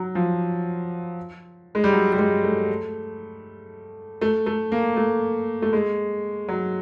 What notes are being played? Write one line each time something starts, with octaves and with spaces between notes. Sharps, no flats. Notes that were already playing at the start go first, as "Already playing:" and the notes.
Already playing: F#3
F3
G#3
G3
F#3
G3
G#3
A3
A3
A3
A#3
A3
A3
G#3
F#3